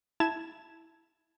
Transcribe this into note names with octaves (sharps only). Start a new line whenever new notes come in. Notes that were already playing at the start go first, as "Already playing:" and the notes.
E4 A5 G#6 E7